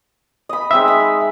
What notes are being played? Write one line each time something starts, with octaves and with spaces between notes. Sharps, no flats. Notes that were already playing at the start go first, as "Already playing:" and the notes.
D#5 B5
G#3 C4 D#4 E5
B5